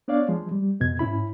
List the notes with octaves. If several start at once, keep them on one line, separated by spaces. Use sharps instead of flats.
B3 D4 C#5 D5 F5
F3 G#3
G3
F2 B2 G#6
G#2 C#4 E4 B5